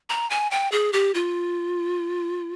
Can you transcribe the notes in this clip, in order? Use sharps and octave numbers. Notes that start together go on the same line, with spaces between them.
A#5
G#5
G5
G#4
G4
F4